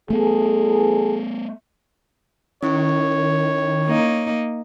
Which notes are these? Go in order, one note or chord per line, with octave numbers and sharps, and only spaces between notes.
E2 A3 B3 G#4 A4
D#3 C#4 E4 C#5 C#6
A#3 D#4